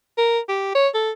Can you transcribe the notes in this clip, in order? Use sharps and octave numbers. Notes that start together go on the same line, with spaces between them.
A#4
G4
C#5
A4